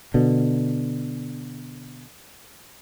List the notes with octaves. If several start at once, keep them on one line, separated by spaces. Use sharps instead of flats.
B2 D3